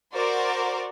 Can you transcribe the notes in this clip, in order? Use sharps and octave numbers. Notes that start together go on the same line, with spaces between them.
F#4 A#4 C5 D5